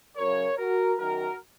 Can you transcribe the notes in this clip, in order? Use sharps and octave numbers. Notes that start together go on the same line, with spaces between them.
F#2 C#3 F#3 A#4 C#5
F#4 A#4
F#2 D#3 F#3 F#4 A#4